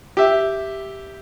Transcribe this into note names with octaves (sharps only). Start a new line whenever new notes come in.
G4 E5